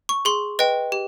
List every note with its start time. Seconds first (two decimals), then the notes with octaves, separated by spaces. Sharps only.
0.09 C#6
0.25 G#4 C6
0.59 B4 D#5 G5
0.92 G4